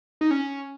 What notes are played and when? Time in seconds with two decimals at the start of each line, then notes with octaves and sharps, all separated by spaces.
0.21 D#4
0.31 C#4